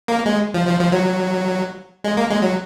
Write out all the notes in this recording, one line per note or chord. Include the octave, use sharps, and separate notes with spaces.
A#3
G#3
F3
F3
F3
F#3
G#3
A#3
G#3
F#3